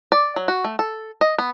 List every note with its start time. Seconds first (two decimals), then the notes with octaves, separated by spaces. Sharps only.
0.12 D5
0.36 F#3
0.48 F#4
0.64 A3
0.79 A4
1.21 D#5
1.38 B3